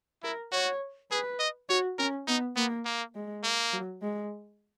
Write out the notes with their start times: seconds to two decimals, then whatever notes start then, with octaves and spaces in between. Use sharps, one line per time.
0.23 E4 A#4
0.52 F#4 C#5
1.11 G#4 B4
1.39 D#5
1.69 F#4 C#5
1.99 C#4 A#4
2.28 B3 D#4
2.56 A#3 B3
2.85 A#3
3.15 G#3
3.44 A#3
3.72 F#3
4.02 G#3